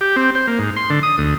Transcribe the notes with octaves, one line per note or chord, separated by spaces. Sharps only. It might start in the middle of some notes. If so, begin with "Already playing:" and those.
G4
C4
C5
A#3
G#2
C6
D3
D#6
D2